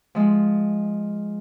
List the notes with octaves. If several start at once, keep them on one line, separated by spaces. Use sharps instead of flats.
F3 G#3